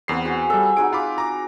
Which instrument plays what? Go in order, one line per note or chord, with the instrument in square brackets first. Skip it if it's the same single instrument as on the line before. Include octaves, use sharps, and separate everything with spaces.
[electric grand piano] E2 C7 [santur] C4 B4 F#5
[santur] F#4 G#4
[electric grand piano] G3 A4 [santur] E5
[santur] D#4 F#4 G#4 [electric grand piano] D7
[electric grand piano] F4 B5 D6
A#5 D6